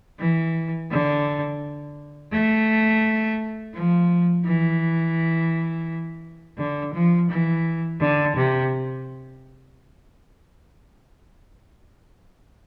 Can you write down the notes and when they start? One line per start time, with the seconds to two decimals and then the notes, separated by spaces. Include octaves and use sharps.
0.19 E3
0.90 D3
2.32 A3
3.74 F3
4.45 E3
6.57 D3
6.94 F3
7.30 E3
8.00 D3
8.36 C3